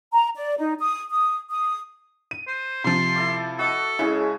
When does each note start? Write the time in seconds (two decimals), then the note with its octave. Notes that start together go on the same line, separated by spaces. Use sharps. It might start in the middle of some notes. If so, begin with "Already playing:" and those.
0.14 A#5
0.35 D5
0.58 D#4
0.80 D#6
1.11 D#6
1.50 D#6
2.31 D#7
2.47 C5
2.84 C3 F3 C6
3.15 E4 A4 D6
3.59 F#4 A4 D#5
3.99 C#3 G#3 C#4 E4